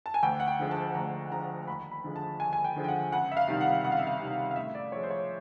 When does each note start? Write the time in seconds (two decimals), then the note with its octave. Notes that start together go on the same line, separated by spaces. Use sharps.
0.06 A5
0.14 G#5
0.23 D2 G5
0.40 F#5
0.48 G5
0.59 D3 F3 G#3
0.71 A5
0.95 D2 A#5
1.31 D3 F3 G#3 A#5
1.67 D#2 B5
1.91 B5
2.04 D3 F3 G#3
2.16 A5
2.40 D#2 G#5
2.53 G#5
2.64 G5
2.76 D3 F3 G#3
2.84 G5
2.88 F#5
3.12 C#2 F#5
3.31 E5
3.37 F5
3.48 C3 D#3 G3
3.61 F#5
3.84 C#2 F#5
3.92 F5
3.99 E5
4.07 F5
4.20 C3 D#3 G3
4.51 F5
4.56 A2 E5
4.75 D5
4.92 F3 G#3 C#5
5.03 C5
5.10 C#5